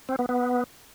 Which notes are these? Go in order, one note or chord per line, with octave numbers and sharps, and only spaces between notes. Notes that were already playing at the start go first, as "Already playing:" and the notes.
C4
B3
B3